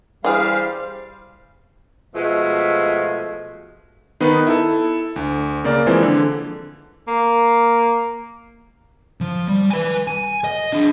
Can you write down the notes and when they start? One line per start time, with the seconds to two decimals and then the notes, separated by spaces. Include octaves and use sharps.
0.24 E3 G3 G#4 C5 F5
2.15 B2 F3 G#3 A3
4.20 D#3 B3 D#4 B4
4.47 E4 A4
5.16 D2
5.64 C#3 A#3 D5
5.86 E3 F3 G#3 C4
6.03 D3
7.08 A#3
9.21 F3
9.48 G3
9.70 B4 G#5
10.08 G#5
10.44 D#5
10.73 D4 G#4